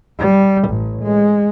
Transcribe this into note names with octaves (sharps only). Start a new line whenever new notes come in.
G3
A1
G#3